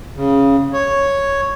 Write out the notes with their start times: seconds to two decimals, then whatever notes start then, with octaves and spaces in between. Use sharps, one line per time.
0.16 C#3
0.73 C#5